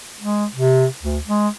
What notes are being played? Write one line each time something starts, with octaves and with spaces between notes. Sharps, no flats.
G#3
C3
D2
G#3